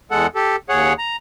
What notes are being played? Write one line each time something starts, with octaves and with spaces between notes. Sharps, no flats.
E2 G#3 A4 F#5
G4 A4
D#2 G#4 C#5 F#5
A#5